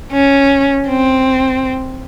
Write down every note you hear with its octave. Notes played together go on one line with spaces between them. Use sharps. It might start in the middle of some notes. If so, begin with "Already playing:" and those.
C#4
C4